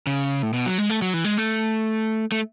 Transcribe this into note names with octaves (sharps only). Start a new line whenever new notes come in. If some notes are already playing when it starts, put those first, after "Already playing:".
C#3
A2
B2
F#3
G#3
A3
F#3
E3
G#3
A3
A3